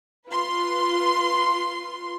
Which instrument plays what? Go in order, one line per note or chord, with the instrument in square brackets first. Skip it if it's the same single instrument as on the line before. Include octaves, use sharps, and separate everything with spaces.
[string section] F4 B4 C6